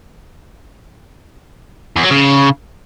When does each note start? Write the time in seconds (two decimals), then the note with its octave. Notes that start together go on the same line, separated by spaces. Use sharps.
1.96 E2
2.04 F#3
2.11 C#3